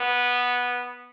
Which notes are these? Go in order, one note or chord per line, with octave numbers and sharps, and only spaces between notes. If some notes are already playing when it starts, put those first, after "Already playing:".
Already playing: B3